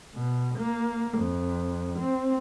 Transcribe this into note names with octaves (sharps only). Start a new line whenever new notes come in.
B2
A#3
F2
C4